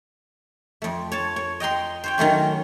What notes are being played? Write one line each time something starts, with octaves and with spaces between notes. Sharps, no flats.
F2 A3
C#5 A5
C#5
D#5 G5 A#5 C6
C5 C#5 G5
D#3 F#3 A3 C#4